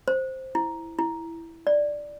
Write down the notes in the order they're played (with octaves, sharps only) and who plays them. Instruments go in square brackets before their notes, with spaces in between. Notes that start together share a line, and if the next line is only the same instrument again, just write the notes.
[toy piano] C5
E4
E4
D5